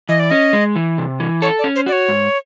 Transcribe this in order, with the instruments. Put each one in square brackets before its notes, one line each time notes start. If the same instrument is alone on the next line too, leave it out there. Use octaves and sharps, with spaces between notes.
[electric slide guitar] E3 [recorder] D#5
[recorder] D5
[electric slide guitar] C#4 [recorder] D#5
[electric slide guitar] G#3
E3
C3
E3
[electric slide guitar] A4 [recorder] C#5
[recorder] D5
[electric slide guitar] C#4
[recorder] C5
[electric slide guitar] F#4 [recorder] D5
[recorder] C#5
[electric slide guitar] G#2